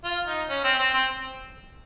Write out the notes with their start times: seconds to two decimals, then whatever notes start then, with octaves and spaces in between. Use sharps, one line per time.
0.04 F4
0.27 D#4
0.50 C#4
0.64 C4
0.79 C4
0.94 C4